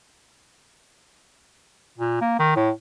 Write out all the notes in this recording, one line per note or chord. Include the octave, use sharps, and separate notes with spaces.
A#2
A#3
D#3
A2